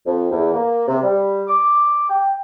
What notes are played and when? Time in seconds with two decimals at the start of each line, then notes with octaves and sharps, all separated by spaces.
0.06 F2
0.31 E2
0.54 A#3
0.88 C3
1.03 G3
1.48 D6
2.10 G5